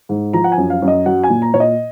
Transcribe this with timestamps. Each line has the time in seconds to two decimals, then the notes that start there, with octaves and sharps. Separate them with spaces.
0.09 G#2
0.33 F3 A#5
0.44 F#5
0.52 G#5
0.58 F#2
0.70 F5
0.82 F#2
0.88 D#5
1.06 F#3 F#5
1.23 G#5
1.30 A#2
1.42 A#5
1.54 A#2 C#5
1.60 D#5